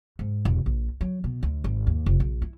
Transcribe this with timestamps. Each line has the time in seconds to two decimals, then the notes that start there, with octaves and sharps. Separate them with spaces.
0.19 G#2
0.45 E1
0.66 A#1
1.01 F#3
1.24 B2
1.43 D2
1.64 G#1
1.87 D#2
2.06 F1
2.20 A#1
2.42 E4